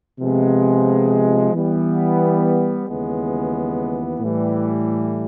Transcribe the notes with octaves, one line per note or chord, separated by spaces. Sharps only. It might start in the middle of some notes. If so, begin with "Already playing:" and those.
C3 F3 G#3 B3
E3 G3 B3
D#2 C#3 E3 G#3 B3
A2 E3 G3